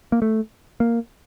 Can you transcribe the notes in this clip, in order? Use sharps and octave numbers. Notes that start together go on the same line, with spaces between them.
A#3
A3
A#3